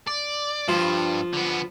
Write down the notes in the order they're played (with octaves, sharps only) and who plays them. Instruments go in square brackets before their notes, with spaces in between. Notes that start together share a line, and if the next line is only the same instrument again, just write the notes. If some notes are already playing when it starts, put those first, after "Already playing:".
[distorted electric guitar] D5
[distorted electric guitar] G2 [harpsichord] F3 F4
[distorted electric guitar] D3 B3